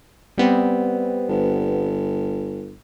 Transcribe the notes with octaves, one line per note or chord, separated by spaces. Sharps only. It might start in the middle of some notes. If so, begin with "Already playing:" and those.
G3 B3 C4
G1